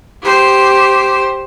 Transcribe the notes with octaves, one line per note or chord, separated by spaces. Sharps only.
G4 C5